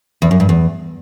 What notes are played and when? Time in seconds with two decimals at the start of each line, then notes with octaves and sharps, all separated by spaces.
0.22 E2
0.31 F#2
0.40 G2
0.49 E2